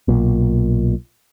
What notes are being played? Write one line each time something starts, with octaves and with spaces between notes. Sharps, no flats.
B1 A#2